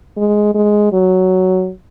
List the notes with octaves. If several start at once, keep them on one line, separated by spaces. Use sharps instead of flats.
G#3
G#3
F#3